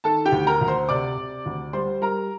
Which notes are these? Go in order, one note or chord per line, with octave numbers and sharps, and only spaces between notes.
D#3 A4 A5
G4 G5
D2
A#4 A#5
D2
C5 C6
C3 D5 D6
C3
D2
G3 C5 C6
G3 A#4 A#5